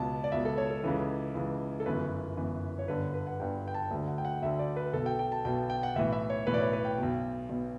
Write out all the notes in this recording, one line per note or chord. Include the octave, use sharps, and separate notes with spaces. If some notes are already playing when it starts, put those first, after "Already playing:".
Already playing: C#2 B2 A5
D5
C#2 B2 E5
A4
C#5
A4
C#2 C#3 E3
C#2 C#3 E3
A4
G1 F#2 E3 B4
G1 F#2 E3
C#5
G1 G2 D3 B4
B4
F#5
G1 G2 D3 G5
G5
A5
D2 D3
F#5
G5
F#5
D2 D3 E5
D5
B4
B1 B2 A4
G5
G5
A5
B1 B2 G5
G5
F#5
B1 A2 E3 E5
E5
C#5
B1 A2 E3 B4
D5
C#5
B4
G5
B1 B2
B1 B2